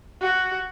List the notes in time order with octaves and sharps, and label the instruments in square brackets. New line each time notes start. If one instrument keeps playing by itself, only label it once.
[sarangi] F#4